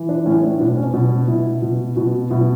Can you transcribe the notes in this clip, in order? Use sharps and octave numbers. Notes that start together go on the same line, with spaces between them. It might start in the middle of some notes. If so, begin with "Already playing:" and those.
Already playing: E3
D4
A2 C#4
D4
B2 D4
C#4
B2 D4
D4
B2 E4
B2
B2 F#4
B2 E4